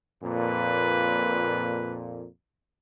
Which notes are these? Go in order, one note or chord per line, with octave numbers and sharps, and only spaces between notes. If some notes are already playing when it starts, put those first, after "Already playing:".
F2 A#2 B4